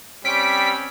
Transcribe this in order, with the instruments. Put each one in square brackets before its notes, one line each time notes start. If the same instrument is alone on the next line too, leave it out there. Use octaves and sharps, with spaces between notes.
[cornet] G3 [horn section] C4 C#4 [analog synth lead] B6 [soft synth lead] D7